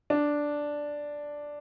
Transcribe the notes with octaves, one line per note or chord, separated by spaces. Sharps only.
D4